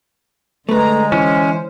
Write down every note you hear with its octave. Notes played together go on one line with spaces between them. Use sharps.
D3 G#3 A3 B4 A#5
E3 C#4 E4 C5